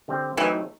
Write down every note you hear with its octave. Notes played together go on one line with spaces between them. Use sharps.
D3 G3 C4
E3 F#3 A3 C4 D#4 E4